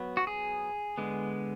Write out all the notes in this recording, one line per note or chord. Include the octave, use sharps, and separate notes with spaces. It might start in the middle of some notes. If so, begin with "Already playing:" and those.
Already playing: F#3 B3
F#4
G#4
D3 G#3 B3